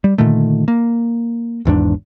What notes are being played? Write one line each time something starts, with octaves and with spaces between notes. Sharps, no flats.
G3
A#2 D3 D#3 A3
A#3
G#1 E2 G#2 D4